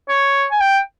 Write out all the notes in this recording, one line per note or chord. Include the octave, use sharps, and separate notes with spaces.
C#5
G#5
G5